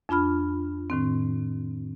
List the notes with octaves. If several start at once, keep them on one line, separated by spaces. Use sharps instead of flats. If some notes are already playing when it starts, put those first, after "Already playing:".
F2 D4 F4 B5 F6
A2 D#3 C4